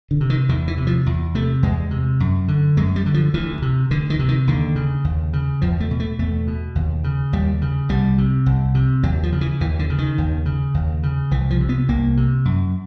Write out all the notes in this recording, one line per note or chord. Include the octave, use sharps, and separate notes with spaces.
D3
C3
D#3
E2 D#3
E3
C3
F3
E2
C3 A3
E2 G#3
C3
F#2
D3
F#2 G#3
G3
D3
F3
D2 E3
C3
D2 D3
D#3
C3
D#3
D#2 D3
C#3
D#2
C#3
E2 F3
A3
B2
A3
E2 A3
B2
D#2
C#3
D#2 G3
C#3
C2 G3
C3
C2
C3
D#2 F#3
F3
C#3
E3
D#2 E3
D3
C#3
D#3
D#2
C#3
D#2
C#3
C2 E3
F3
C3
B3
C2 A#3
C3
F#2